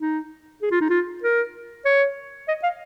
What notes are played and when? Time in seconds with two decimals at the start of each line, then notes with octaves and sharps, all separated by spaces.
0.01 D#4
0.62 G#4
0.72 F4
0.81 D#4
0.90 F4
1.23 A#4
1.85 C#5
2.48 D#5
2.63 F5